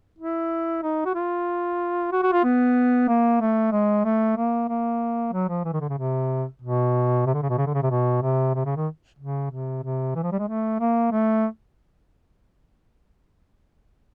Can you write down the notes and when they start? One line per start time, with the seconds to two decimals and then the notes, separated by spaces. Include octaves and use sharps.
0.19 E4
0.83 D#4
1.05 F#4
1.15 F4
2.12 F#4
2.23 F#4
2.32 F4
2.44 B3
3.08 A#3
3.41 A3
3.72 G#3
4.05 A3
4.36 A#3
4.69 A#3
5.33 F#3
5.49 F3
5.65 E3
5.73 D#3
5.81 D3
5.89 C#3
5.98 C3
6.62 B2
7.26 C3
7.34 D3
7.42 C#3
7.49 B2
7.58 C#3
7.66 D3
7.74 C#3
7.82 C3
7.90 B2
8.22 C3
8.55 C3
8.65 C#3
8.76 D#3
9.19 C#3
9.51 C3
9.83 C3
10.15 E3
10.23 F3
10.32 G3
10.39 G#3
10.48 A3
10.80 A#3
11.12 A3